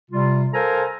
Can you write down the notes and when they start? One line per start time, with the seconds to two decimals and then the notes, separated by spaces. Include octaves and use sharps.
0.11 C3 G3 F4
0.53 A4 A#4 C5 F5 G#5 A#5